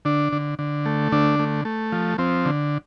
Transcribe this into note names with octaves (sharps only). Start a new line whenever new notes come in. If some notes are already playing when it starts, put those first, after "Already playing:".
D3 D4
D3
D3
A3
D3 D4
A3
A3
F3
F3 C4
D3